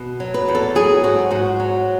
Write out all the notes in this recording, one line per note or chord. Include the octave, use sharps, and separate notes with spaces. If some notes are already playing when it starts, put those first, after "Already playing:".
Already playing: B2
F#3
B4
E2
A4
F#3 G#4
G#2 F#4
G#2 F#4
F#3